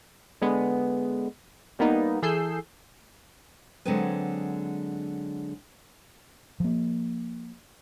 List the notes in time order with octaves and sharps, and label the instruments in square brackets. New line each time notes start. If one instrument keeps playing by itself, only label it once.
[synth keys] D3 G#3 B3
G3 A#3 B3 D#4
E3 G#4 A4 E6 G6 C7
[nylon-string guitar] D3 F#3 G#3 C4 G#4 B4
[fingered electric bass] F3 A#3